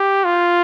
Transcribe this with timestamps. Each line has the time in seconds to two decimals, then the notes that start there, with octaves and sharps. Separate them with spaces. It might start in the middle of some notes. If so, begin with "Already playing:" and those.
Already playing: G4
0.25 F4